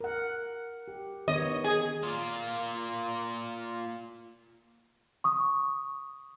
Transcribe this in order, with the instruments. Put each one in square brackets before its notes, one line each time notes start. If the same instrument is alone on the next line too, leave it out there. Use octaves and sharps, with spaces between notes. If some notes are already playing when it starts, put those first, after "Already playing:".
[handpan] A#4 F#5
G4
[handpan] D#3 B3 C#5 [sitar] D#5
[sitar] G#4
[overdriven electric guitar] A#2 F4
[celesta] C#6 D#6